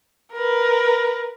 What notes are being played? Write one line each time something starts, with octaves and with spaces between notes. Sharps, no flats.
A#4 B4